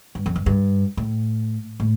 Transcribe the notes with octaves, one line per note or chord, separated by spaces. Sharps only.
G2
F2
G2
G2
A2
A2